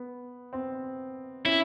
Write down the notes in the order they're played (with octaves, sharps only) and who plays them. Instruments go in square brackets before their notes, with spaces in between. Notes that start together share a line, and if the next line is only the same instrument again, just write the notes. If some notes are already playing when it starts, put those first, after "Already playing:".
Already playing: [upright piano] B3
C4
[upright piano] C#4 [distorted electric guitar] E4